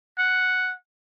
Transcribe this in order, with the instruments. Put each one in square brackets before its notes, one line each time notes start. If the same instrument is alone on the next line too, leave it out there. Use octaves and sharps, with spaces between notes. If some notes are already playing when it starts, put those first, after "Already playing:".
[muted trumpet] F#5